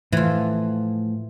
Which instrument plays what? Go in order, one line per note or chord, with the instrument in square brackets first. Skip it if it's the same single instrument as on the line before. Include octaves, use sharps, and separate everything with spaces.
[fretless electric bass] A2 F3 [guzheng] E3 F4